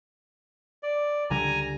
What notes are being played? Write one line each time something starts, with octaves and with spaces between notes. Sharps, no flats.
D5
C#2 D3 G3 G#5 A#5